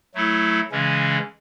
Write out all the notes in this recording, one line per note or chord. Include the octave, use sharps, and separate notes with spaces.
F#3 A3 E4 A4
C#3 E3 G#3 C#4